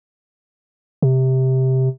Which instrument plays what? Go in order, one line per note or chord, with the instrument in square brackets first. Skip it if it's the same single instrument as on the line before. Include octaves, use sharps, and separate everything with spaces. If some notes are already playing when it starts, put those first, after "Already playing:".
[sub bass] C3